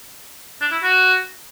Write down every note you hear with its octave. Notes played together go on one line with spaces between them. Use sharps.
D4
E4
F#4